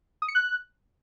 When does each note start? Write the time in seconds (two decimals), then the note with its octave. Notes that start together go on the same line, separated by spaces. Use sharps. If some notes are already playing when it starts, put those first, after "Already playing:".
0.22 D#6
0.28 C#7
0.35 F#6